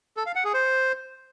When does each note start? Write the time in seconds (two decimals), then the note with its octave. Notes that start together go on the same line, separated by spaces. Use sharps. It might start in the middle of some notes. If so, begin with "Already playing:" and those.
0.17 A4
0.26 F5
0.35 F#5
0.45 G#4
0.54 C5